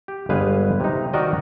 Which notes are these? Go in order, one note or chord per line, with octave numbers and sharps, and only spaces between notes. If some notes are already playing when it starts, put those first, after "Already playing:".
G4
G1 G#3 B4 F5 G#5
C3 D#4
D#3 D#4 F#4 A#4 D5 D#5